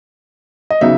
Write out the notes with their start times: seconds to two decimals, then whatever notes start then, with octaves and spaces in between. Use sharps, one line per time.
0.70 D#5
0.81 C#3 F#3 B3 D#4 E5